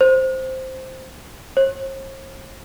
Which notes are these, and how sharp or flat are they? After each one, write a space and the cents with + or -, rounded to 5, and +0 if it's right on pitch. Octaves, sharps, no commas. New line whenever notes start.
C5 +0
C5 +45